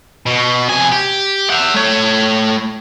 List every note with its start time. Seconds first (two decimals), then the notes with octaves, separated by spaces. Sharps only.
0.26 B2
0.69 C3 G#5
0.92 G4
1.50 E5 F#5
1.74 A3 C#5